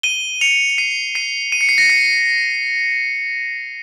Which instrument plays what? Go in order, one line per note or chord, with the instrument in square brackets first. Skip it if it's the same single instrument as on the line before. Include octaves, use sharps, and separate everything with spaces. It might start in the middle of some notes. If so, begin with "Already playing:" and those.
[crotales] D#7 G7
C#7 F7
F7
C7 D#7
C7 D#7
D#7
C#7
C7
A#6 C#7
C7